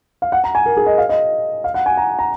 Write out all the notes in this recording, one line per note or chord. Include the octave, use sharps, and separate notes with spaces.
F5
F#5
A#5
G#5
A#4
G#4
D#5
F5
D#5
F5
F#5
G#5
A#5
A#5